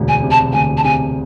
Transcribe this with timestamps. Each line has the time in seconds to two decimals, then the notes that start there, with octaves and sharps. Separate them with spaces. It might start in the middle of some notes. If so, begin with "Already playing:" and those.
Already playing: E1 D2
0.08 G#5
0.23 C3
0.31 A5
0.53 D2 G#5
0.77 A5
0.84 C3 G#5